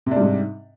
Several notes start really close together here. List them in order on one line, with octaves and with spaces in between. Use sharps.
C3 D4 G3 G#2